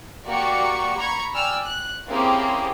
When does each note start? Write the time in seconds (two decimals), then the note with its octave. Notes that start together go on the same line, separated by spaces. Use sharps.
0.27 A#3 F#4 G4 D5 C#6
0.97 A#5 B5 C#6 G#6
1.35 D5 G5 G#5 E6 F6
1.64 F#6
2.09 A#3 C4 C#4 E4 G4 G#4